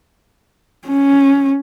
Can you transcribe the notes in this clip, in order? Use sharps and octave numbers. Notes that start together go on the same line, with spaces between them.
C#4